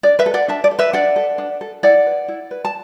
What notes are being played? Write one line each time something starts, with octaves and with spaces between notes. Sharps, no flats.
D4 D5
B4 E5
A4
D5 F#5
D4 E5 A5
D5
A4
B4 E5
D4 D5 F#5
A4
D4
A4
E4 D5 F#5
B4
E4
B4
A5